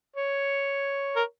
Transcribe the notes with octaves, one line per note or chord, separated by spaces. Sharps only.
C#5
A#4